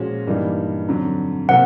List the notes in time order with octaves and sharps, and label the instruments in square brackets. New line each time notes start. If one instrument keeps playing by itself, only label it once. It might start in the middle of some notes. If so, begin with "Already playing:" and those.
Already playing: [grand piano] A#2 F3 G#3 C#4 F#4
G2 E3 G3 A#3 D#4
F2 D3 F#3
[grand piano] C3 F3 A#3 [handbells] F#5